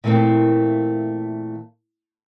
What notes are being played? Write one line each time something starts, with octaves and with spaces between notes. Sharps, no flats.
A#2 E3 A3 A#3 C4